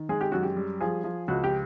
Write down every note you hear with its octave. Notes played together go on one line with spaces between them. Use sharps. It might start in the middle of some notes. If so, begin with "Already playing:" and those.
Already playing: D#3
G#3 G#4
G4
F#2 F#4
G4
G3
F3 G#4
F3
C#2 F#4
G4